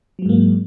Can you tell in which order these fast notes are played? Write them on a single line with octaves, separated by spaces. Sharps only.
F#3 G#3 G#2 A#3